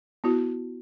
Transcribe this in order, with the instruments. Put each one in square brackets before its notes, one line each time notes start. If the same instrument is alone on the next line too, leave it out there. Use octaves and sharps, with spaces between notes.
[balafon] B3 E4 F#4